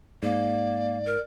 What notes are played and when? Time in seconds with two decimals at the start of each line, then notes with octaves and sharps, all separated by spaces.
0.23 G#2 A#3 D5
1.06 A#4